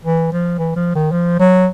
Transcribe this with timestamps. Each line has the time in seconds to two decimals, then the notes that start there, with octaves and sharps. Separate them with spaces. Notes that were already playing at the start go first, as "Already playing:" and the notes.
0.05 E3
0.32 F3
0.59 E3
0.76 F3
0.95 D#3
1.12 F3
1.39 F#3